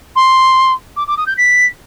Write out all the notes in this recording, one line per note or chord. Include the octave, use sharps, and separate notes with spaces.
C6
D6
D6
D#6
G6
B6